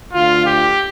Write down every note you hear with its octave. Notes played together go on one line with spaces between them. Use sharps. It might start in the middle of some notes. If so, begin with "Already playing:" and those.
D2 D3 F4
G4